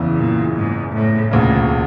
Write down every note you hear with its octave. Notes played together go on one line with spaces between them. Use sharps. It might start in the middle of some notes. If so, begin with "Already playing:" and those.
Already playing: F#1 E2 C#3 E3
A#2
G#2
A2
E1 D2 A#2 C#3